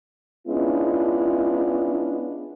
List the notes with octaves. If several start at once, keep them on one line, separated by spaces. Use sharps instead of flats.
G#3 B3 C#4 D4 E4 F4